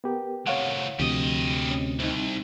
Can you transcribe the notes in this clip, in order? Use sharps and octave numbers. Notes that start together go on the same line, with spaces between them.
B3 G4 A#4
A2 C3 C#5 F5 F#5
D2 C3 F3 G3 D#5
C#4
C2 C4 D#4